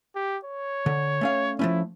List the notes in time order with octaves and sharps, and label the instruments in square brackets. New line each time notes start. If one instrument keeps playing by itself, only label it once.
[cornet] G4
C#5
[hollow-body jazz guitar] D3
A3 C#4 F5
[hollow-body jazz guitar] F3 A3 C#4 [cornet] E4